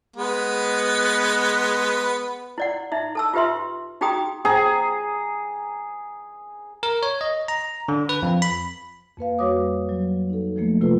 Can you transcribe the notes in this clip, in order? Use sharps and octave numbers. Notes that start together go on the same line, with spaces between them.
G#3 B3 B4
E4 D5 F#5
D#4 E4 E5
A4 A5 E6
F4 G4 B4 E5 C6
D#4 F#4 G#4 G5 A#5 D#6
G#4 A#5
A#4
C#5
D#5
A#5
D3
B4
F2
B5
F2 A#3 B4 F5
G3 F#4 B4 C#5 D6 D#6
F#3
D#4 A4
E3 F3 A3 A#3
C3 A3 A#3 F4 A4 B4